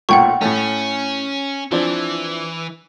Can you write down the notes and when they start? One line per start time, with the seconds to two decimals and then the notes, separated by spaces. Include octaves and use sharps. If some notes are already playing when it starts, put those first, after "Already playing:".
0.09 B1 A#2 A3 F#5 G5 C#6
0.41 A2 A3 C#4
1.72 E3 F3 C4 D4